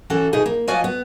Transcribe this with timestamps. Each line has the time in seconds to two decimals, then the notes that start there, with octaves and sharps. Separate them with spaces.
0.10 E3 C#4 F#4 A4
0.33 B2 D#4 G#4
0.46 A#3
0.68 F3 F#4 D5 D#5 F5 G#5
0.84 B3